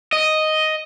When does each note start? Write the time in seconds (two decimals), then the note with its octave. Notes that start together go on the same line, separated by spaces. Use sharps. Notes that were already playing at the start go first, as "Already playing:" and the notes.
0.13 D#5